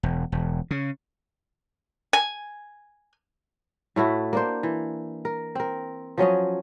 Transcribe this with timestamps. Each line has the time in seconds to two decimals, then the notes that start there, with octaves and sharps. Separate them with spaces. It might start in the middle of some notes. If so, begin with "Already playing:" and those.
0.03 E1
0.32 E1
0.71 C#3
2.13 G#5
3.96 A2 A3 E4 F#4
4.33 A#3 D4 C5
4.63 E3
5.25 A#4
5.55 C4 A#4
6.18 F3 F#3 C#4 D#5